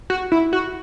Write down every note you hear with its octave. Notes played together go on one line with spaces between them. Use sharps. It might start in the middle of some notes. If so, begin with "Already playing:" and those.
F#4
E4
F#4